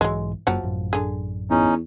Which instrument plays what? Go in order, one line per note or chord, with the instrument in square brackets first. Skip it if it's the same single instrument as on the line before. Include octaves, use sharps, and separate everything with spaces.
[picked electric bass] B1 G#2 E3 [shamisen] F#3 G#3
[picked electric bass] G1 F#2 A#3 [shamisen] F3 F#3 F#5
[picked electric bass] A1 F#2
[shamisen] D3 G#4
[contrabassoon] E2 [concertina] C#4 D#4